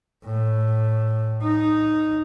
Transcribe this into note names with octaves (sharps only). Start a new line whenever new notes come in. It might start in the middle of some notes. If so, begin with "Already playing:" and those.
A2
D#4